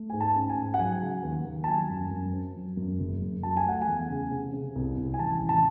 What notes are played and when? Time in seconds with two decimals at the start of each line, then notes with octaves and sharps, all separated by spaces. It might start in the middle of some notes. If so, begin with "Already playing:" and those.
Already playing: A3
0.10 G#2 G#5
0.21 A5
0.36 C#4
0.49 G#5
0.57 G#2
0.74 F#5
0.79 F#3 G#5
1.02 C#3
1.23 D#2
1.45 D#2
1.64 A5
1.67 F#3 G#5
1.89 F#2
2.11 F#2
2.33 C4
2.56 F#3
2.77 F#2
3.00 F#1
3.22 F#2
3.43 F#3 A5
3.57 G#5
3.65 A3 F#5
3.82 G#5
3.87 E2
4.09 C#3
4.31 C3
4.53 C3
4.76 C2
4.98 C2
5.14 G#5
5.19 A1 A5
5.42 A1
5.49 A5